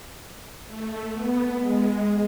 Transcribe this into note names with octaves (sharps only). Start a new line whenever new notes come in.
A3
B3
G#3